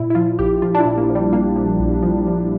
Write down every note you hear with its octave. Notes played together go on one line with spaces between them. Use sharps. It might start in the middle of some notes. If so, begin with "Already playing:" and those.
Already playing: A#2 E4
E4
F3 F4
A#1 G4
F3 F4
D4
E4
A#2
A#3
F3
G3
A#2 A#3
F3
A#1
F3
F3